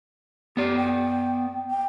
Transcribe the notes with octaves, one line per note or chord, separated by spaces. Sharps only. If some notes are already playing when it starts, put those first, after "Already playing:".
B3 G4 D5
G5
G5